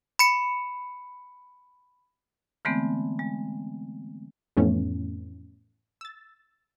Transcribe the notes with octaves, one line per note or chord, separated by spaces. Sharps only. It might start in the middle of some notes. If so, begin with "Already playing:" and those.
B5 C#7
D3 E3 G#3 A3 B3 C4
G#3
F2 A2 E3 A3 B3 C#4
E6 A6